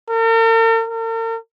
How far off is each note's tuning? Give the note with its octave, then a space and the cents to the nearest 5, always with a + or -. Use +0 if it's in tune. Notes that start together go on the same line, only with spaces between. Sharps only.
A#4 -45
A#4 -45